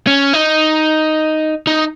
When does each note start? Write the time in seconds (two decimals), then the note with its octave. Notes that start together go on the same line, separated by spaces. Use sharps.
0.07 C#4
0.34 D#4
1.67 D#4